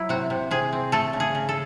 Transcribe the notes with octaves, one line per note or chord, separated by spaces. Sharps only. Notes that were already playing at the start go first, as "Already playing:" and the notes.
Already playing: F#3 E4
C3 F#4
C3
C3 G#4
C4
A3 A4
C#3
G#4
C#3
A4